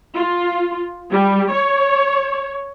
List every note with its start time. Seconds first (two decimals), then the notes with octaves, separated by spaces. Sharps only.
0.15 F4
1.12 G3
1.53 C#5